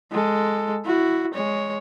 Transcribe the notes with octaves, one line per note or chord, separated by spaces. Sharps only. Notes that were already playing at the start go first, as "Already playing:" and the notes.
G#3 A4
E4 F#4
G#3 C#5